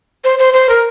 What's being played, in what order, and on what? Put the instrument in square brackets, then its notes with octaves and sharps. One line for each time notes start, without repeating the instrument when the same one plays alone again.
[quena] C5
C5
C5
A#4